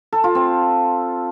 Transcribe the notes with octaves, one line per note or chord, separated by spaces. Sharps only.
A4
F4
C4